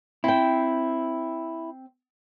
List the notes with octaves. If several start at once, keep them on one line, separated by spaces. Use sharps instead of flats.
C4 E4 G5